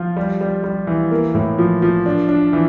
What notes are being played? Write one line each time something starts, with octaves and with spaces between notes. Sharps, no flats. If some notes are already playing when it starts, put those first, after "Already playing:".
Already playing: F3 F4
G3
G3
G3
E3
A#3
A2
F3
F3
D4
D4
E3